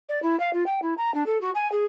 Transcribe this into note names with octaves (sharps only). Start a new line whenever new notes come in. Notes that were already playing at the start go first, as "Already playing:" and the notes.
D5
E4
F5
F4
G5
E4
A#5
D4
A4
F#4
G#5
G#4